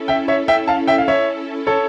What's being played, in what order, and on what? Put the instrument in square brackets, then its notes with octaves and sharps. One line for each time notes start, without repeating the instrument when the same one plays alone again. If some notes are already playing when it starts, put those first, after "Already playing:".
Already playing: [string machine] C#4 E4 A4
[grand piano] E5 G5
C#5 E5
E5 G5
F5 A5
E5 G5
F5
C#5 E5
A4 C#5